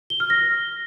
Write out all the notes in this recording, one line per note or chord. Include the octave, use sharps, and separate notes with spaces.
G7
F6
A#6